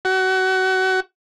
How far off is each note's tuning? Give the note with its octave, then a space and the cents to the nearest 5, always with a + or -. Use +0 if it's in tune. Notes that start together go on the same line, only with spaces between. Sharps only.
F#4 +25